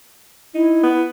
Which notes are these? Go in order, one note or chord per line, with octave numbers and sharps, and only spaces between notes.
D#4 E4
B3